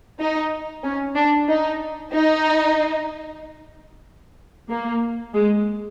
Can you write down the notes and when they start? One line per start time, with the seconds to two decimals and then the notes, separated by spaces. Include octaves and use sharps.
0.19 D#4
0.83 C#4
1.15 D4
1.48 D#4
2.13 D#4
4.69 A#3
5.34 G#3